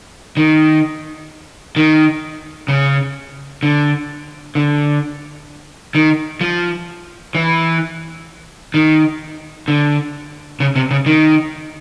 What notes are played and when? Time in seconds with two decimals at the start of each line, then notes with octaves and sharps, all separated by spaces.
0.37 D#3
1.76 D#3
2.68 C#3
3.63 D3
4.55 D3
5.95 D#3
6.41 F3
7.35 E3
8.74 D#3
9.68 D3
10.60 C#3
10.76 C3
10.91 C#3
11.06 D#3